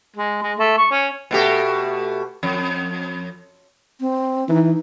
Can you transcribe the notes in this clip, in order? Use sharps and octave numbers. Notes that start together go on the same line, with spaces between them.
G#3
G#3
A3
C#6
C#4
B2 A3 G4
F2
C4
E3 D#4